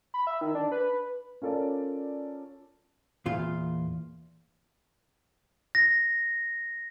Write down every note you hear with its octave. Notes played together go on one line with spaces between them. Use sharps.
B5
E5
D#3
D4
B4
B4
C#4 F4 A4 A#4 D5
E2 A#2 F4
A#6